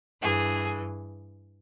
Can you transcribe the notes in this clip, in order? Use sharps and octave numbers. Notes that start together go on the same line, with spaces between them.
G2 E3 G#4